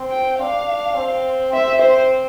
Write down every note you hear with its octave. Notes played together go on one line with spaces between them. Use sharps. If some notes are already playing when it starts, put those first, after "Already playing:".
Already playing: C4
G5
D4 F5
C4
C4 E5
C5